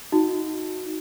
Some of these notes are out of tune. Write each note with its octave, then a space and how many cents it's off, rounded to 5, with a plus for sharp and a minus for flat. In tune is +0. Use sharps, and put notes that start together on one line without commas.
D#4 +20 F#4 -10